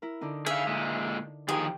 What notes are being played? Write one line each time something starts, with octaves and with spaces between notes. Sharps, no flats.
E4 A#4
D3 D4 D#4
G#4 E5 F5
A#2 G#3
D#3 F3 G4 G#4 A#4 G5 G#5